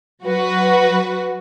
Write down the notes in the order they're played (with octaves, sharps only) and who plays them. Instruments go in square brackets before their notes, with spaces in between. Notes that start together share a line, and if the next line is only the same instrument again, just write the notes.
[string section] F#3 F#4 B4